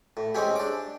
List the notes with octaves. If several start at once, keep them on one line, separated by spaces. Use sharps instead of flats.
A2
G#3 C4 C#4 G4
D4 D6